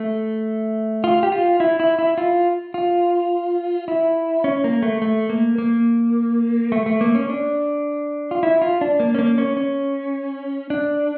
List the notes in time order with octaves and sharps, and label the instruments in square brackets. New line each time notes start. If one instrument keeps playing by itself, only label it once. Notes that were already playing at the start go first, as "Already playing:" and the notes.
Already playing: [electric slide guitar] A3
F4
G4
F4
E4
E4
E4
F4
F4
E4
C#4
A#3
A3
A3
A#3
A#3
A3
A3
A#3
C#4
D4
F4
E4
F4
D4
A#3
C#4
A#3
C#4
C#4
D4